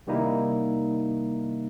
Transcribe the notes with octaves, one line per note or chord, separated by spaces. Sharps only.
C3 D#3 G3 A#3 D#4 E4